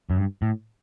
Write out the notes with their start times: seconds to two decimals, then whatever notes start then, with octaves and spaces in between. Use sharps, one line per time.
0.10 F#2
0.16 G2
0.42 A2